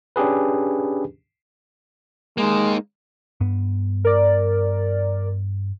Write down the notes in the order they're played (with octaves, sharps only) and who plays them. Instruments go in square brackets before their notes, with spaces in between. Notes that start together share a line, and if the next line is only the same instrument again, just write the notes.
[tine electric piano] C#4 D4 G4 G#4 B4
[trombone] G#3 [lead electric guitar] A#3 D#4
[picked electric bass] G2 B3
[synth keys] A#4 D5